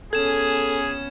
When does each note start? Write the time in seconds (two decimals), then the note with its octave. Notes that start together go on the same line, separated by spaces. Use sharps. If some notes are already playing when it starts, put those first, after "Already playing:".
0.13 B3 C#4 G#4 A4 G#6 E7